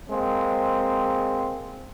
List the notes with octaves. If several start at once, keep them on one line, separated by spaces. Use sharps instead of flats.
G#3 A#3 C4